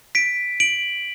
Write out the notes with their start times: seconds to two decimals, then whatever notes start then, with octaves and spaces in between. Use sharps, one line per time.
0.15 B6 D7
0.60 D7 F#7